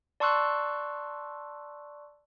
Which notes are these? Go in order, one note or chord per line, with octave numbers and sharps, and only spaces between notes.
D5 A5 C6 C#6 E6 F#6